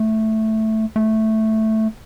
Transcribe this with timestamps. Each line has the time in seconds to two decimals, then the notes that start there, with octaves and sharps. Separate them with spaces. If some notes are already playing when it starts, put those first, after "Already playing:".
Already playing: A3
0.96 A3